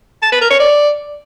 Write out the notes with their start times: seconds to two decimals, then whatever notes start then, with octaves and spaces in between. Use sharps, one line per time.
0.22 A5
0.32 B4
0.41 A#4
0.51 C#5
0.60 D5